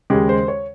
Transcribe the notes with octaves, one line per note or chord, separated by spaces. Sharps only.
D#2 C#3 G#3 G4
C5
C#5